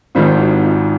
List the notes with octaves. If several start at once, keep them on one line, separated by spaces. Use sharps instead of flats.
G#1 G#2 D#3 G3 C4 D#4 F4
E4 F#4
D#4 F4